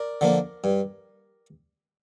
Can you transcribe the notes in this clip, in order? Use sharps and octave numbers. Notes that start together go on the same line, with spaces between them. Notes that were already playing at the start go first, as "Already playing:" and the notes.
Already playing: A#4 D5
D3 F3 A#3
G2